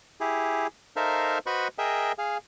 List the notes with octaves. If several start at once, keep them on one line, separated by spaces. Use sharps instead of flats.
E4 G4 G#4
D#4 A4 A#4 C5 E5 F5
F#4 B4 C5 D#5 B5 C#6
G#4 A#4 D#5 E5 G5
G#4 F5